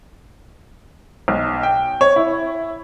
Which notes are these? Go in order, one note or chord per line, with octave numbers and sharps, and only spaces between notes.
B1
G5
C#5
E4